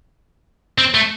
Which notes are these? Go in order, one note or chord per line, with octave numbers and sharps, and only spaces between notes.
C4
A3